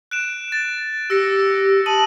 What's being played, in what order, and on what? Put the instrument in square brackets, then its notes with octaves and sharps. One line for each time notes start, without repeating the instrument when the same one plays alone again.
[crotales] F#6 D7 E7
A6
[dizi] G4 [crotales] E6 A#6 C#7
[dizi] A5 [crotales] D#6 D#7 F#7